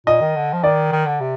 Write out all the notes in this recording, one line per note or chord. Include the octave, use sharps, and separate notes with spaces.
A#2 D#5
D#3
D3
F3
D#3 D5
D#3
D3
C3